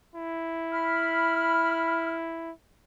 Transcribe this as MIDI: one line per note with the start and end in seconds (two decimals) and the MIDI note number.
0.15 2.51 64
0.73 2.13 83
0.73 2.13 89